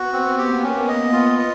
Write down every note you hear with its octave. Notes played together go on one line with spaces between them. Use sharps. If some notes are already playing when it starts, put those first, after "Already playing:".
Already playing: B3 F#4
C4
A#3 G4
C#4
B3 D#5
F4
D#5